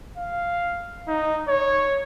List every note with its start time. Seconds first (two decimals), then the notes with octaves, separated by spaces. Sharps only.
0.17 F5
1.08 D#4
1.48 C#5